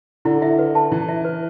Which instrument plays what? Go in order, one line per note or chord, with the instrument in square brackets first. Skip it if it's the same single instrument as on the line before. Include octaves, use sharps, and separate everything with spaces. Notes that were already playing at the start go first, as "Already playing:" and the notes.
[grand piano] D3 [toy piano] E4
[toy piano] E5
B4
A5
[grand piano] E3 [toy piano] E4
[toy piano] E5
B4